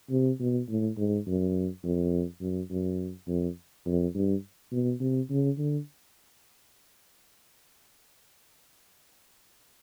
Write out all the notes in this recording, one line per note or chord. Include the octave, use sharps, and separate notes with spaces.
C3
B2
A2
G#2
F#2
F2
F#2
F#2
F2
F2
G2
B2
C3
C#3
D3